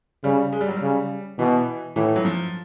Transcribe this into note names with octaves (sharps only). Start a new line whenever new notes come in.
C#3 G3
G#3
G3
F#3
C#3 G3
B2 E3
A2 E3
F#3
F3